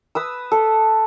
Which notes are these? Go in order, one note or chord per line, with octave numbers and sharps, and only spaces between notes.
B4 D#6 E6
A4